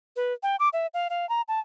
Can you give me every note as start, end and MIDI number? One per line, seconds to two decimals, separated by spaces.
0.16 0.33 71
0.43 0.56 79
0.60 0.69 86
0.73 0.87 76
0.94 1.08 77
1.10 1.28 77
1.29 1.41 82
1.48 1.60 81